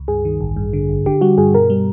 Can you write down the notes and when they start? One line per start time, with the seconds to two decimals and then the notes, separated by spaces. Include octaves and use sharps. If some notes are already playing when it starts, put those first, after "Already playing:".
Already playing: C#2
0.08 G2 G#4
0.25 D#3
0.41 A1
0.56 G2
0.73 D3
0.89 G1
1.06 D3 G4
1.21 G3 F#4
1.38 G2 G#4
1.54 B2 A#4
1.70 G3